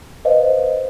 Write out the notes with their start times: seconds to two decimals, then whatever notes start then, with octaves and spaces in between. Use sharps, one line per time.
0.25 B4 C5 D#5 F5